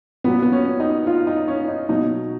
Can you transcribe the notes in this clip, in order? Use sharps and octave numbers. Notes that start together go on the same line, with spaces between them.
A#2 F#3 B3
B3
C#4
D#4
F4
D#4
C#4
D#4
B2 F#3 D#4